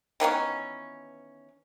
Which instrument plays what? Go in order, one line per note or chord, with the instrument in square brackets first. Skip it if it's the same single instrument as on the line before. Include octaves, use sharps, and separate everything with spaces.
[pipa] D#3 E3 B3 C#4